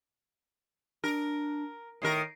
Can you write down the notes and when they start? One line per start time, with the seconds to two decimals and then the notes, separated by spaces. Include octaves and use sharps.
1.04 D4 A#4
2.02 A2 D#3 A#4 C7